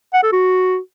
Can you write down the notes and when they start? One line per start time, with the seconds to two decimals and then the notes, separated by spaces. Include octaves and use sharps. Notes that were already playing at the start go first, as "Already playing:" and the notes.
0.14 F#5
0.23 A4
0.32 F#4